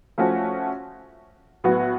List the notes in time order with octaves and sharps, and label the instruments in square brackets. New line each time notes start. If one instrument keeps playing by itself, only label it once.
[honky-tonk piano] F3 A3 C#4 F#4
A2 F#3 B3 F#4